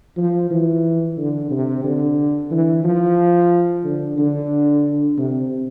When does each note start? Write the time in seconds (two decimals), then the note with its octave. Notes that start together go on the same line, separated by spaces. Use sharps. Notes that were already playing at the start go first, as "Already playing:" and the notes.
0.17 F3
0.50 E3
1.17 D3
1.50 C3
1.84 D3
2.51 E3
2.84 F3
3.84 D3
4.18 D3
5.18 C3